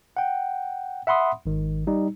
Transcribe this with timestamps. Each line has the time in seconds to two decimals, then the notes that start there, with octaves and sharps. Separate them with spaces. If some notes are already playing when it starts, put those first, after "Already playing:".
0.17 F#5 G5
1.07 E5 F#5 B5 C6 D#6
1.46 G#1 D#3
1.87 G3 D#4